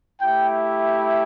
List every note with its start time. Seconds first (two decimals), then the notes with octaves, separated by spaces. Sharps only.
0.21 A3 E4 G4 G5